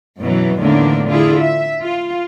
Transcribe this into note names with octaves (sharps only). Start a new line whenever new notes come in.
F#2 B2 E3 F#3
E2 A2 D3 D#3 A#3 D4
D3 E4 F4 G#4
E5
F4